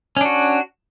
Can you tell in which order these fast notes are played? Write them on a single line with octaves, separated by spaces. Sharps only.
C#4 D4 F#4